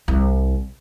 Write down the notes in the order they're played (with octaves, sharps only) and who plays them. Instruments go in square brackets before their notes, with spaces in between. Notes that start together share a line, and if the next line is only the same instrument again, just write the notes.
[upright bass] C2 E4